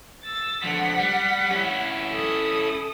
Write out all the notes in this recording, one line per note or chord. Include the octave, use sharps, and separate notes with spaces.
E6 A6
D3 F3 F#5 B6
G3
C#4 E4
A4 D#6